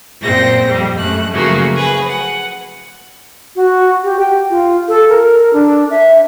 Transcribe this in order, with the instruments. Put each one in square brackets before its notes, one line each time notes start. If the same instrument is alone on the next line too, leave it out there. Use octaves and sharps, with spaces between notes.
[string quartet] F#2 A#2 C4 A#6
F2 G3
F#2 A3 F#6
C#3 F3 F#3 A3 A#3
G#4 B4
F#5
[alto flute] F#4
G4
G5
F4
A4
A#4
D4
E5